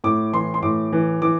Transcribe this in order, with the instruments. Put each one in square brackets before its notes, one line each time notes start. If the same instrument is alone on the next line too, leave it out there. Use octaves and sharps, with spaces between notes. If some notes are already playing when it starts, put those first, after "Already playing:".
[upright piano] A2 D6
E3 C6
C6
A2 D6
E3
E3 D6